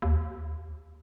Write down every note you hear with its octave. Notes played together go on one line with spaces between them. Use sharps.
D#2